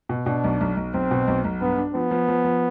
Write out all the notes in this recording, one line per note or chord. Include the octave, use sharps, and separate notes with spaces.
B2
B2 D4
B1
B1
B1
B1 C4
B2
B1
B1
G2 B3
D4
F3 B3
F3
F3
F3